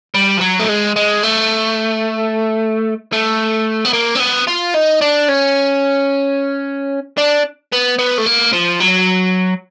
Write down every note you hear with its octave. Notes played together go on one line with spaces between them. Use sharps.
G3
F3
F#3
A3
G#3
G#3
A3
A3
B3
A#3
C4
B3
F4
D#4
D4
C#4
D4
B3
B3
A3
A#3
F3
F#3